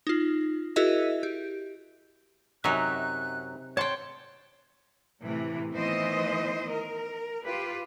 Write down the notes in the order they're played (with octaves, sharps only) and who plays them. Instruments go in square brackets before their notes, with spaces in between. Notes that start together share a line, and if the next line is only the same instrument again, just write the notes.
[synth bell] D#4 F4
E4 F#4 G#4 A#4 D#5 E5
G4
[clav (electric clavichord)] F#2 F#3 E5 [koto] C3 D#4 [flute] F#6
[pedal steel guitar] C#5 F#5 C6 [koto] G5 A5
[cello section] A2 C3 E3
D#3 E3 A3 B3 C5 D#5
A#4
F4 G4 B4